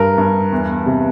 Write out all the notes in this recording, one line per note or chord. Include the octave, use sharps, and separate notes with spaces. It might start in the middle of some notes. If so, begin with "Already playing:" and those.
Already playing: G2 A#4
G2
E2
C3